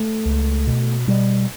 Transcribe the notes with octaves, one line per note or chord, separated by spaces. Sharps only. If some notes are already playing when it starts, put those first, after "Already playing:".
Already playing: A3
C#2
B2
B2 G3